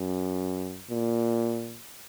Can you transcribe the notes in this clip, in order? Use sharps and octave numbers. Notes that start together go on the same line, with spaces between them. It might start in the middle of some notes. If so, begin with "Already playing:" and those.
Already playing: F#2
A#2